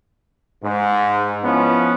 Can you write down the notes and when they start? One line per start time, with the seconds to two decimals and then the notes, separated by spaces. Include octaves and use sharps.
0.63 G#2
1.43 F3 B3 C#4 E4